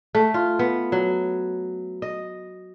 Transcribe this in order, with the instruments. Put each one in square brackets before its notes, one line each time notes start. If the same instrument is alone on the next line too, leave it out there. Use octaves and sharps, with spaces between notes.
[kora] A3
F4
B3
F#3
D#5